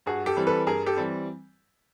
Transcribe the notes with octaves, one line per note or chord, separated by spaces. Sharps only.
G2 F#4 G#4
G4 A4
E3 G3 C4
A4 B4
G2 G#4 A#4
G4 A4
E3 G3 C4